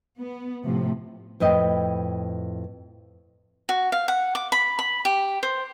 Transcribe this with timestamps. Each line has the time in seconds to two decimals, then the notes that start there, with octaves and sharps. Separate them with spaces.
0.18 B3
0.64 A2 C3 F3
1.40 F2 A2 B4 D#5 G5
3.69 F#4
3.92 F5
4.08 F#5
4.35 D6
4.52 B5
4.79 B5
5.05 G4
5.43 C5